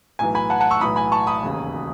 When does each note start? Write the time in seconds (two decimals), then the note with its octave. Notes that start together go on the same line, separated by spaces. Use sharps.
0.19 B1 A2 E3 G#5
0.35 G#5 B5
0.50 F#5 A5
0.60 F#5 A5
0.71 C#6 E6
0.81 B1 A2 E3 B5 D#6
0.96 G#5 B5
1.12 A5 C#6
1.27 B5 D#6
1.43 E1 D#2 C#3